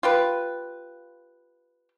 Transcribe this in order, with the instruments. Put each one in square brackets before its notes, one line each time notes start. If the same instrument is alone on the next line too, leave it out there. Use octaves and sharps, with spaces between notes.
[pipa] F4 G4 B4